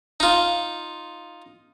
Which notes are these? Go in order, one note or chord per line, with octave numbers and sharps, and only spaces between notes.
D#4 F4